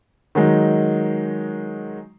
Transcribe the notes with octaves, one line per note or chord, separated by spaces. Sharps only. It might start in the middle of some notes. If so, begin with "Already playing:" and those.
D#3 F#3 G#3 D#4